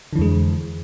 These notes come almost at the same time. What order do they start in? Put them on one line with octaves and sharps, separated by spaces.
D3 E3 F2 G#3